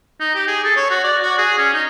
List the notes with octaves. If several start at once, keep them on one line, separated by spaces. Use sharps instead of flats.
D#4
G4
G#4
A4
C#5
F#4
D5
F#4
G#4
C#4
D#4